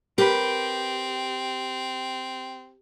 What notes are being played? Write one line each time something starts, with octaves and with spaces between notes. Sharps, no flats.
C4 G4 A#4 B4